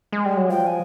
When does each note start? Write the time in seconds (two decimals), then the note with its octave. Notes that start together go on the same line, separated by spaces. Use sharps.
0.13 G#3
0.25 G3
0.37 F#3
0.50 F3 G5
0.67 G#5